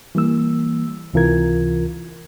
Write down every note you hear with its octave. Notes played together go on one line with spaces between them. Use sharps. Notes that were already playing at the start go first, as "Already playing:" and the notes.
E3 G3 A#3 E6
C#2 C3 E3 F4 A#4 G#6